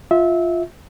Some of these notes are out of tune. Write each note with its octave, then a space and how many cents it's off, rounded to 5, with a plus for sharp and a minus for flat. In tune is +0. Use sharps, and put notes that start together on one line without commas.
F4 +0 E5 -20